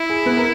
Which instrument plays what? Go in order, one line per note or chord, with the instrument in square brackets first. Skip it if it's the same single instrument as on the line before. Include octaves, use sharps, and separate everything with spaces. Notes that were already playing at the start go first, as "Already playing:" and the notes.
Already playing: [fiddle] E4
[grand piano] G#4
B3 B4
A#4